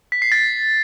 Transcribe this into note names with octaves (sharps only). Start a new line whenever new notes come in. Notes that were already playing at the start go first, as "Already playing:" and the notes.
B6
C7
A6